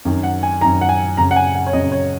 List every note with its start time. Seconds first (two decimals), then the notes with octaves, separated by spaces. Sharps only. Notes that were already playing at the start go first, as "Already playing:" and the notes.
0.05 F#2 D#3
0.23 F#5
0.43 G#5
0.61 D#3 A#5
0.65 F#2
0.81 F#5
0.89 G#5
1.17 F#2 C#3 A#5
1.31 F#5
1.36 G#5
1.55 F#5
1.67 C#5
1.73 F#2 C#3 D#5
1.92 C#5